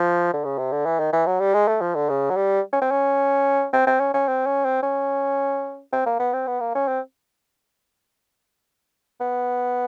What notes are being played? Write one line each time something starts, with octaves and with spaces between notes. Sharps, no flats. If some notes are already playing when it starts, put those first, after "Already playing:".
Already playing: F3
D3
C#3
C3
D3
E3
D#3
E3
F#3
G3
G#3
A3
F3
D3
C#3
F#3
G3
C#4
C4
C#4
C4
C4
C#4
C#4
C4
C#4
C4
C#4
C4
A#3
B3
C4
B3
A#3
C#4
C4
B3